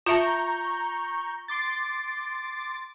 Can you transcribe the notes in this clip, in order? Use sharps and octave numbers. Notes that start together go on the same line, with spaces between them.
F4 E5 A5 A#5 C#6 G6
C6 D6 A6